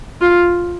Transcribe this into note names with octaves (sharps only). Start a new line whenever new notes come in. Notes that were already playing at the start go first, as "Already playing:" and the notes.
F4